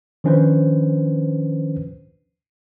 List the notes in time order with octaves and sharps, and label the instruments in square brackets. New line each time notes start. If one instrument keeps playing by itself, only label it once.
[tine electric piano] D#3 F3 C#4 D4 B4 C5